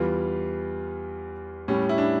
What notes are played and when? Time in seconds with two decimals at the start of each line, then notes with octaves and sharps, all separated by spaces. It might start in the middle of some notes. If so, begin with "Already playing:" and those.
Already playing: E2 E3 G3 F4
1.68 A2 G3 C#4
1.89 E4
1.98 D4